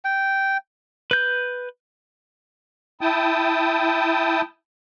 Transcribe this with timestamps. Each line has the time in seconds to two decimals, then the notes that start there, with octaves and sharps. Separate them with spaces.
0.05 G5
1.11 B4 G6
3.01 E4 G5 A5 D#6